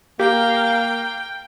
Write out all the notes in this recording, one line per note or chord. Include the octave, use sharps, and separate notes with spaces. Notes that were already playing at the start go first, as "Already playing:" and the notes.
A#3 G4 F5 G5 A#5